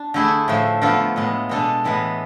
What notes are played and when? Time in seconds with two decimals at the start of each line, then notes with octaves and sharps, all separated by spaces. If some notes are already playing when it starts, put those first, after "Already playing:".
Already playing: D4
0.14 D3 A3 E4 G#4
0.48 A2 F3 A3
0.82 D3 F3 B3 F4 A4
1.16 A2 G#3 B3
1.49 B2 G#3 D4 A4
1.84 A2 E3 G#3 B3